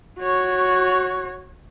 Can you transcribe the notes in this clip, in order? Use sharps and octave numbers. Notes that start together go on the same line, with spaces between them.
F#4 C#5